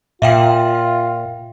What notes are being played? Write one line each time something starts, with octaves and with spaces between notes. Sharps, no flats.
A#2 F4 E5 F5 G5